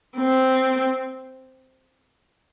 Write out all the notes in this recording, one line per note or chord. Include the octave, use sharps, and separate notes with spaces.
C4